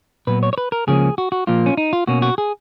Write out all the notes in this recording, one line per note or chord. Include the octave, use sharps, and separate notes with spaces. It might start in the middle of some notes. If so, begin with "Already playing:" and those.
A#2 F#3 B3 B4
C#5
C#5
B4
A#4
C#2 C#3 F3 A#3 C#4 G#4
F#4
F#4
A#2 F3 A#3 F4
C#4
D#4
F4
B2 A#3 C#4 F#4
F#4
G#4